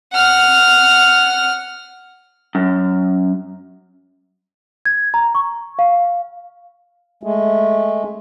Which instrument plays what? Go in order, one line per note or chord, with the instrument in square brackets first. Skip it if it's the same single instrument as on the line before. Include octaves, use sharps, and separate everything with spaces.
[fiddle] F#5 F6
[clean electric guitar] F#2
[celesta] G#6
A#5
C#6
F5
[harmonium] G#3 A3